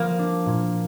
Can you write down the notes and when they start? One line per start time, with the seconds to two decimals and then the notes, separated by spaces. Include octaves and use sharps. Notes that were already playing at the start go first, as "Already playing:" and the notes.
Already playing: F3 A#3
0.19 D4
0.46 A#2